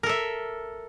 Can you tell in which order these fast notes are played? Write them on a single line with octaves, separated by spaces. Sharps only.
A#4 A4 E5